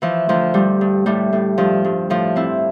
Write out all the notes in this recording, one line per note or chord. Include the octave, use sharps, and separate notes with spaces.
E3 F3
D2 F3
G2 G3
G2
A2 G3
A2
G2 F3
G2
A2 F3
A2 C4 E4